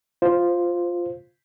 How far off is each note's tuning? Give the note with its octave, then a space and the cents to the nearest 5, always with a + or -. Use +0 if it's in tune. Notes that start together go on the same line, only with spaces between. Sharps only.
F4 +0 C5 +0